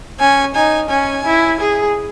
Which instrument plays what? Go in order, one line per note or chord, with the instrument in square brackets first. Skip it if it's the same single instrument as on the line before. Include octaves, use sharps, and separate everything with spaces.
[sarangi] C#4 [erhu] G#5
[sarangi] D#4 [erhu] G#5
[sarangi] C#4 [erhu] G#5
[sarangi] E4
G#4